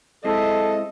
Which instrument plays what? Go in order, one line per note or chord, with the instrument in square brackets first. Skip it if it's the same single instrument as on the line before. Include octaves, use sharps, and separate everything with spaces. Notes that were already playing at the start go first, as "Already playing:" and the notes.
[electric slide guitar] G#3 C4 E4 [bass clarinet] A4 [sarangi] D#5